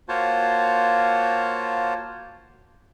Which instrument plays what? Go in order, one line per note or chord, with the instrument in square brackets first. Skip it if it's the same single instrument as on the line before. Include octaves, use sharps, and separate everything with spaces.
[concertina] A#3 F4 F#4 C5 C#5 A5